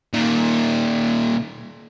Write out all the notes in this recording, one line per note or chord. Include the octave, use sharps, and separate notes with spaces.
A#2 D#3